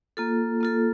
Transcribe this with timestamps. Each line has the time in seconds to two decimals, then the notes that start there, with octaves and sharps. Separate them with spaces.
0.17 A#3 F4 A4
0.61 A#3 F4 A4